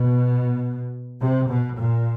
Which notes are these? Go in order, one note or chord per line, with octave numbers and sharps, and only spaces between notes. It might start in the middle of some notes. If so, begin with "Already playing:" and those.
Already playing: B2
C3
B2
A#2